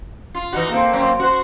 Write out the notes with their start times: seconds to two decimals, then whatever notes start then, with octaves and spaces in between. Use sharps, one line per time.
0.35 F4
0.53 E3 D#4 F#4
0.70 A#3 C4 A4
0.93 F#3 C4 C#4
1.20 F#4 C5